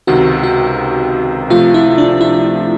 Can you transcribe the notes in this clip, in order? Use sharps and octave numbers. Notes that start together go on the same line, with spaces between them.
C#2 C3 D#3 F#4
F#4
C3 F3 A3 F4
E4
D4
E4